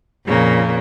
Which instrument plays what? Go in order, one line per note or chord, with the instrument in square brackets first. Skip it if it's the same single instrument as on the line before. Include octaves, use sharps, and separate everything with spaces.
[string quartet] F2 A#2 C#3 A#3